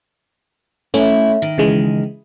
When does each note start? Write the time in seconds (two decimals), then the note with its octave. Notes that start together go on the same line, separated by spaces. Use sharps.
0.94 A3 C#4 E4
1.42 D#3
1.58 C#3 E3 G#3